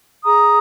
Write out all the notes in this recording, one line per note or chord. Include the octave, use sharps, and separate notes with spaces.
G#4 A#5 D#6